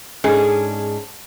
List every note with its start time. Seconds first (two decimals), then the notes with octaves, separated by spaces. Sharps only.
0.24 G#2 C#4 D4 G#4